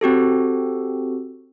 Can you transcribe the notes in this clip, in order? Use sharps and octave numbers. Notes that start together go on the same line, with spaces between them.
C4 F#4 G4 A4